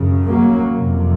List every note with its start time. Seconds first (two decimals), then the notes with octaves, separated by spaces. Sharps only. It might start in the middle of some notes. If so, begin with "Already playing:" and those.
Already playing: F#2 C#3
0.26 F#3 A#3
0.78 F2 C3